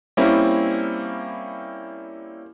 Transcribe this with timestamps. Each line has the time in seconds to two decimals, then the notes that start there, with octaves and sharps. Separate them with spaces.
0.17 G3 A#3 C4 C#4 E4